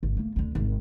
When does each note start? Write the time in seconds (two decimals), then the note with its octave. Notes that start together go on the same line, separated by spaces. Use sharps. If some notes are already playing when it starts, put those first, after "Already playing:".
0.03 G#1
0.17 A3 A#3
0.36 D2 D3
0.55 G#1 C#4